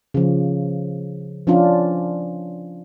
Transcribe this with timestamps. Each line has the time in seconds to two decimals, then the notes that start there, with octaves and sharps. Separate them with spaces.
0.14 C#3 F3
1.47 F3 C#4 D4 F4